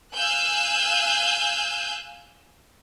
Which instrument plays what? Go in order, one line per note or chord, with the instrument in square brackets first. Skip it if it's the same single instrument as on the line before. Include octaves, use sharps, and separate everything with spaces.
[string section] F5 G#5 E6 F#6 G6